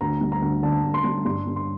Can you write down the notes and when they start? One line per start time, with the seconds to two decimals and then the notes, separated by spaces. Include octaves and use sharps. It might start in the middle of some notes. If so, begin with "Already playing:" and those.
0.01 D2 A#5
0.21 G3
0.32 A#5
0.42 D2
0.63 D3 A5
0.84 D2
0.94 C6
1.04 G3
1.25 G2 C6
1.47 G3
1.56 C6